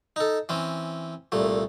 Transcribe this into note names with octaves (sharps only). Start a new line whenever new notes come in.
D#4 A4
E3 C4 C#4
C2 A#2 A3